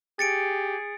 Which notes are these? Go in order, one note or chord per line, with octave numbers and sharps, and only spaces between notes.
G4 G#4 A6 C#7 D7